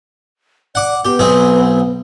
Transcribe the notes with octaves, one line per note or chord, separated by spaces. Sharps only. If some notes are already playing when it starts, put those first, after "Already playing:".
D5 F#5 D6
B3 G4
B1 C4 G#4